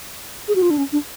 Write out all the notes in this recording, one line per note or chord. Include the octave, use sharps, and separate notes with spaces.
G#4
F#4
F4
D4
C#4
D4